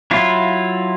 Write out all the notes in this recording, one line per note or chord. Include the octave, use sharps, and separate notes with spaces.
F#3 E4 F4